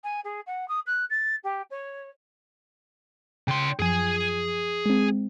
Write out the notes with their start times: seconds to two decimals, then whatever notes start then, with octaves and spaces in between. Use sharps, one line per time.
0.04 G#5
0.24 G#4
0.47 F#5
0.68 D#6
0.87 F#6
1.10 A6
1.44 G4
1.71 C#5
3.48 C#3 G5 C6
3.79 F#2 F3 G#4 G#5
4.86 G#3 C4